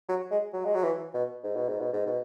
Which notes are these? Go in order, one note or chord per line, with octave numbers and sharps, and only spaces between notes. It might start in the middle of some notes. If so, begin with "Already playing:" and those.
F#3
G#3
F#3
G#3
F#3
E3
B2
G#2
B2
G#2
B2
G#2
B2